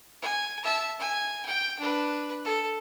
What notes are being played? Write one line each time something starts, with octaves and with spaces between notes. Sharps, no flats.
G#5
E5 A5
G#5
G5
D4 B4
A4